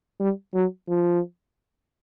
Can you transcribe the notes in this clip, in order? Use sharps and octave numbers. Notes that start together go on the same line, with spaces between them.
G3
F#3
F3